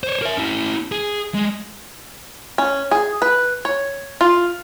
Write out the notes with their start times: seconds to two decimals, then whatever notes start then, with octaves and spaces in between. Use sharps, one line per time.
0.04 C5 C#5
0.22 A#4 E5
0.37 C#4 E4
0.92 G#4
1.34 G#3
2.58 C#4
2.91 G#4
3.22 B4
3.65 C#5
4.21 F4